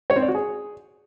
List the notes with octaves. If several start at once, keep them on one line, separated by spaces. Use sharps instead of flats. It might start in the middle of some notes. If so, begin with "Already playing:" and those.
C#5
C4
D5
F#4
G#4